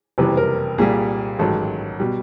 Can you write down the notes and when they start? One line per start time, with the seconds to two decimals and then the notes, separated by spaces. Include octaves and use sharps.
0.18 F#1 F2 C3 E3 G3 B4
0.37 A#4
0.78 C2 A#2 G3 G#4
1.39 A1 G#2 D#3 F#3 A4
2.00 B2 G3